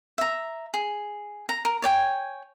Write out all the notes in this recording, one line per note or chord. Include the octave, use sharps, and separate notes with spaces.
E5 A#5
G#4
A#5
A#4
C#5 D5 G5 G#5